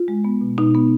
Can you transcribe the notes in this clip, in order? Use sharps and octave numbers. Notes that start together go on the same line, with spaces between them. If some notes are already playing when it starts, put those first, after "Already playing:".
Already playing: F4
G#3
B3
B2
B2 D#4
B3